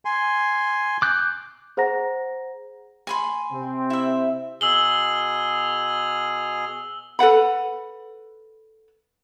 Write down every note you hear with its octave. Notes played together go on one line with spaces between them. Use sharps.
G#5 C6
D6 F#6 G6
G#4 C5 F#5 A#5 A#6
G#5 B5 C6
C3 C4
E4 E5
B2 G#4 E6 F6 F#7 G7
A4 B4 F#5 B5